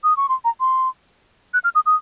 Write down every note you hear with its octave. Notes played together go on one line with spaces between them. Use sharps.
D#6
C#6
C6
A#5
C6
F#6
F6
D#6
D#6